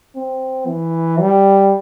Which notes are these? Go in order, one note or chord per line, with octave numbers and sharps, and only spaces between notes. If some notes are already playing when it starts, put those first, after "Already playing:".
C4
E3
G3